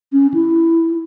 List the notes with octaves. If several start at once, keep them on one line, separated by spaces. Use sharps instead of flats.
C#4
E4